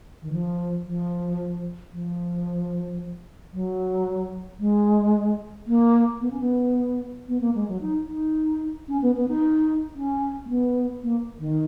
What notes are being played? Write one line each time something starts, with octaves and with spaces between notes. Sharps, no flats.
D#3
F3
F3
F3
F#3
G#3
A#3
B3
C#4
B3
B3
A#3
G#3
F#3
D#4
D#4
C#4
B3
B3
D#4
C#4
A#3
B3
A#3
D#3